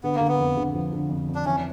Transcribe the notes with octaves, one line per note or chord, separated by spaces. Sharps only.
D3 B3
A#3
D3
B3
F2
D3
F3
D3
F2
F2
D4
E3 C#4